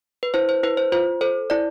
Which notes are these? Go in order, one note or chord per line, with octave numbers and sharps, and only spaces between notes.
B4
E4 C5
C5
E4 B4
C5
F4 C5
A4 C5
E4 D5